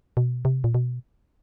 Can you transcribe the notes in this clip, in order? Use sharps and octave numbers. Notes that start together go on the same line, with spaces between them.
B2
C3
A#2
B2